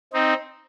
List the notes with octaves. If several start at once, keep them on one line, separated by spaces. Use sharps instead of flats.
C4 D#4